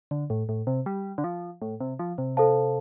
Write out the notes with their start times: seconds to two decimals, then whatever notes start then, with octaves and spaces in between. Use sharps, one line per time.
0.11 D3
0.30 A2
0.49 A2
0.67 C3
0.86 G3
1.18 D3
1.24 F3
1.62 A2
1.80 C3
1.99 F3
2.18 C3
2.37 A4 C5 F5 A5